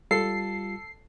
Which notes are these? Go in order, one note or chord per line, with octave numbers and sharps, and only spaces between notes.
G3 F4 A4 C7